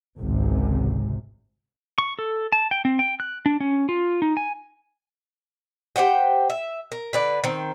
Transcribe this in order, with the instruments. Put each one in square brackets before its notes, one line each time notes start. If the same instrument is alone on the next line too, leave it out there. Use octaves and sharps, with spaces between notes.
[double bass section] G#1 C#2 C3
[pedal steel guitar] C#6
A4
A5
G5
C4
G5
F#6
D4
C#4
F4
D#4
G#5
[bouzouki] G4 C5 F#5 G5
E5
A#4
D3 B4 D5
D#3 C4